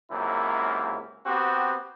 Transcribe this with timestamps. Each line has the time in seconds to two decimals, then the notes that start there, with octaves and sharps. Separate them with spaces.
0.11 C#2 F#2 C3 A#3 E4
1.26 B3 C4 F#4 G4